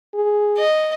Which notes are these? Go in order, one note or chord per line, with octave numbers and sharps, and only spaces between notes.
G#4
D#5